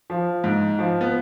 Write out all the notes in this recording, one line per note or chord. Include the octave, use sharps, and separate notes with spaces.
F3
G#2
F3
B3